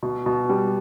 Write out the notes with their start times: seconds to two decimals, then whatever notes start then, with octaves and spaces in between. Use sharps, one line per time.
0.03 B2
0.26 B2
0.49 G3